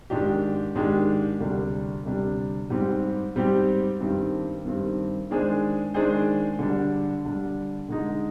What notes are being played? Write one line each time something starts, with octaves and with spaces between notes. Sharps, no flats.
G#2 D#3 G#3 D4 G4
G#2 D#3 G#3 D4 G4
D2 C3 G3 D4
D2 C3 G3 D4
G#2 G3 C4 G4
G#2 G3 C4 G4
G2 D#3 G3 C4
G2 D#3 G3 C4
D#3 G#3 D4 G#4 C5
D#3 G#3 D4 G#4 C5
D3 G3 D4
D3 G3 D4
D3 G#3 D#4